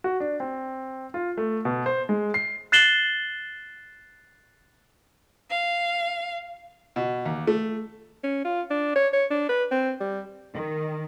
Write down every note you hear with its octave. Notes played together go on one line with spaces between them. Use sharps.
F#4
D4
C4
F4
A3
B2
C5
G#3
C7
F#6 A6 C7 E7 F#7 G7
F5
B2
D#2
A3
C#4
F4
D4
C#5
C#5
D4
B4
C4
G3
D#3